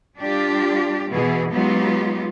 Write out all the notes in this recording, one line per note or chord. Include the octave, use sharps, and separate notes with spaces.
G3 D4 F4 G4
B2 E3 B3 E4 G#4
F#3 G#3 B3 D#4 F4 G4